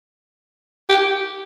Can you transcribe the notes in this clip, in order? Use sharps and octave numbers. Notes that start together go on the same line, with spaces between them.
G4